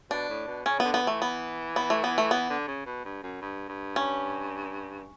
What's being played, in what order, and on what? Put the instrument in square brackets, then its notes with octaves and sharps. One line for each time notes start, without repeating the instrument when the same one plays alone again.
[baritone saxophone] B2 [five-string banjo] D4
[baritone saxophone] A2
B2
[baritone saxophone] C#3 [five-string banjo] C#4
[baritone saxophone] D3 [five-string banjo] B3
[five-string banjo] B3
[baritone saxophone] E3
[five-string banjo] A3
B3
B3
A3
B3
A3
[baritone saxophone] E3 [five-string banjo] B3
[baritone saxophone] D3
C#3
B2
G2
F#2
G2
G2
[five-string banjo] C#4